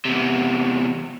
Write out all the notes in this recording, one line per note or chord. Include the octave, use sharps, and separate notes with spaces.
E2 C3